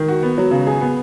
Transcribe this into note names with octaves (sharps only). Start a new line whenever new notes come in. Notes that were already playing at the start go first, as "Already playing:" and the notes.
Already playing: D#3
F#4
B3
F#3
C#3
G#4
B3